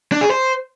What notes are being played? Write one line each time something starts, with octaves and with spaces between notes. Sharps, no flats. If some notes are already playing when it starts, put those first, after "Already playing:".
D4
G#4
C5